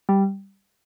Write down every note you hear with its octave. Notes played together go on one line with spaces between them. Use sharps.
G3